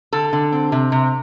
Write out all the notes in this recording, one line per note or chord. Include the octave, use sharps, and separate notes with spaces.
D3 A4
D3
C4
C3
C3